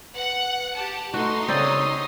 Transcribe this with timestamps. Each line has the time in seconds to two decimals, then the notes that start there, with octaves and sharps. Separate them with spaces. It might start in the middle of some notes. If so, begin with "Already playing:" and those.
0.15 B4 F#5
0.75 G4 A5
1.14 A3 D#4 F#4 C6
1.48 C#3 C4 C#5 D5 G5 D#6